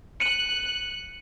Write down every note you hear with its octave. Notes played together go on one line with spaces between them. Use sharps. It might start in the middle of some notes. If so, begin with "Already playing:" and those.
F#6 C#7 D#7 F#7